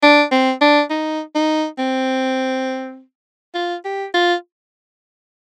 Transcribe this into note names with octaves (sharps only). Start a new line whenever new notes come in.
D4
C4
D4
D#4
D#4
C4
F4
G4
F4